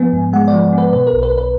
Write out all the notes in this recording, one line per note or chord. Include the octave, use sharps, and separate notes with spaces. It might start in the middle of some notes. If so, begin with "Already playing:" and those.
Already playing: F3 B3 G#5
G#2
G#3 F#5
D5
F3
B3
B4
B2 B4
A#4
B1
B4
B1
B4